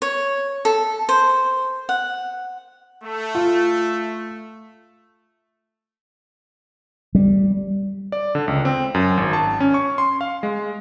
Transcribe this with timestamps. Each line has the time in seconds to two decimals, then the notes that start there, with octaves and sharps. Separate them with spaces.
0.02 C#5
0.65 A4
1.09 C5
1.89 F#5
3.03 A3
3.35 F4
7.15 G3
8.12 D5
8.35 D3
8.48 C#2
8.65 C4
8.94 F#2
9.17 G#1
9.33 A5
9.60 C#4
9.74 C#6
9.98 C6
10.21 F5
10.43 G#3